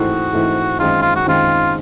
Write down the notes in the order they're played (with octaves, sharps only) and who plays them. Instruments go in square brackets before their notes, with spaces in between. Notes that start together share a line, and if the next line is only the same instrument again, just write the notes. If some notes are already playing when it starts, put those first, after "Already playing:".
Already playing: [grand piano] G#2 E3 A3 C4 E4 [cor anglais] F#4
[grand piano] G#2 E3 A3 C4 E4
[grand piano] F#2 D#3 G#3 C4 [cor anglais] F4
[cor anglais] F4
F#4
[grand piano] F#2 D#3 G#3 C4 [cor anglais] F4